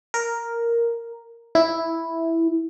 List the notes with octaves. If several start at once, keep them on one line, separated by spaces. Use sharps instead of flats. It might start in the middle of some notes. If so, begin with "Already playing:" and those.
A#4
E4